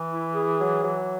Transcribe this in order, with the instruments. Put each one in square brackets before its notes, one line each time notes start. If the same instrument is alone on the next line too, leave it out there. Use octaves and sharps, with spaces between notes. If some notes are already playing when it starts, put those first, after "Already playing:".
Already playing: [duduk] E3
[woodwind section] E4
G#4
F#3
F#3